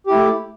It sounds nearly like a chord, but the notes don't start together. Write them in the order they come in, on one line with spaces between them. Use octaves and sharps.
G4 E4 A3